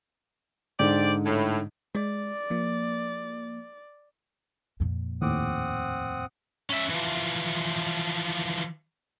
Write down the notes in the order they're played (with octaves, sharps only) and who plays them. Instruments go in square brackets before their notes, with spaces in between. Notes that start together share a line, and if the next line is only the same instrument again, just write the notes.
[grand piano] G#2 D3 [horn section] G4 C5 D5
[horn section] A2
[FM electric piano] G#3 [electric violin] D5
[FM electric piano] F3 A#3
[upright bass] F2 A#2
[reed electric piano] D#2 A2 D6 [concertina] C4 F#5 D#6
[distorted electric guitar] C#4 E5
E3 F3